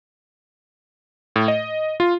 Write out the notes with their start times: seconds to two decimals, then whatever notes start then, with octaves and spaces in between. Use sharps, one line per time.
1.36 A2
1.48 D#5
2.00 F4